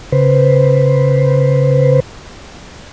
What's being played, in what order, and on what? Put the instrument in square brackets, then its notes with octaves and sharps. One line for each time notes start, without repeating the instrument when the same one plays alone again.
[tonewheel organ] C#3 B4 C5